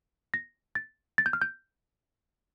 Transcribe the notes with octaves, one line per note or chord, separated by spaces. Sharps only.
A#6
A6
A6
G6
F6
G6